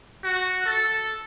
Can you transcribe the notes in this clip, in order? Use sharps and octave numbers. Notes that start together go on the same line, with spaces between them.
F#4
A4